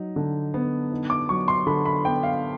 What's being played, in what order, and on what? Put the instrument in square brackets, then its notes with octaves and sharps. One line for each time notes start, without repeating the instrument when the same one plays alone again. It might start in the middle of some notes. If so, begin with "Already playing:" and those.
Already playing: [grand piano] F#3 D#4
D3
B3
D#4
[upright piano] D6
[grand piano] F#3 [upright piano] C#6
[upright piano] C6
[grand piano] D3 [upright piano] B5
[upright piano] B5
[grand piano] B3 [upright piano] G5
[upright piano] F5